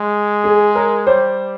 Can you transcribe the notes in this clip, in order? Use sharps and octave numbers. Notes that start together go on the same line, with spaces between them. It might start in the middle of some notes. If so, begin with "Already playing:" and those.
Already playing: G#3
G#4
A#4
G3 C5